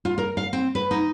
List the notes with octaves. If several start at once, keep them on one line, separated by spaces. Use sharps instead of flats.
F4
A#4
F5
C4
B4
D#4